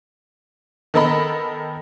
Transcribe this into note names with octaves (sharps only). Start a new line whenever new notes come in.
D#3 B3 A4 A#4 D#5 B5